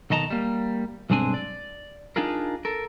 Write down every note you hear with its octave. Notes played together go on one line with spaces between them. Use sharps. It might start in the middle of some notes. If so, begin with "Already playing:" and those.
B1 D#3 D#5 A5 A#5
G3 A#3
B1 G2 G#3 C4 D4 G#5
D5
D4 D#4 F4 G#4 A#4
A4 A#4